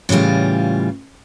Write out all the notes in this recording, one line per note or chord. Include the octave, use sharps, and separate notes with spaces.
A2 C#3 E3 G3 F4